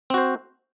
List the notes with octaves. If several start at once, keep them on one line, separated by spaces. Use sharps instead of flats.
C4 F#4 C5